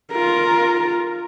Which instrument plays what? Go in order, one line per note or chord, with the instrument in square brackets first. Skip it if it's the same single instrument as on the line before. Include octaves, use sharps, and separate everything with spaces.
[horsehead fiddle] F4 A#4